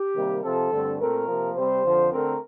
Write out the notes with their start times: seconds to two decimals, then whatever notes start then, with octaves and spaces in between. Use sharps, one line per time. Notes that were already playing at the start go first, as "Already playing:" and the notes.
Already playing: G4
0.14 C3 D#3 G3 A#3
0.42 C3 F3 C4 A4
0.71 G2 D3 A3 C4
0.99 A#2 A3 C4 A#4
1.28 C3 F3 A#3
1.55 C3 G3 C4 C5
1.84 F2 D3 F3
2.12 D3 A3 C4 A#4